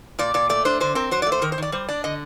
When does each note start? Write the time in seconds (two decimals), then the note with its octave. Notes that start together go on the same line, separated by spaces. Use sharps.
0.19 A#2 D5
0.34 A#2 D5
0.49 A3 D5
0.65 D4 C5
0.80 D3 C5
0.95 C4 A#4
1.11 F#3 C5
1.22 D5
1.27 A3
1.32 C5
1.42 D#3 A#4
1.52 C5
1.58 D#3 D5
1.72 G3 C5
1.89 D4 D5
2.04 D3 D#5